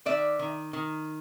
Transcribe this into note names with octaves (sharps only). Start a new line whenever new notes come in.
D#3 D5 E5
D#3
D#3